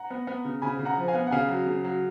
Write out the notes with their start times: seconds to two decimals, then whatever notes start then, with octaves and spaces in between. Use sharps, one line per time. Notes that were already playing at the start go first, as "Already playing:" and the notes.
Already playing: F#5 A#5
0.10 B3
0.27 B3
0.45 C#3
0.62 C#3 G#5 B5
0.79 C#3
0.85 F#5 A#5
0.97 F3
1.08 F5 G#5
1.14 B3
1.27 F#5
1.31 C#3 F5 G#5
1.49 F#3
1.66 C#3
1.84 F#3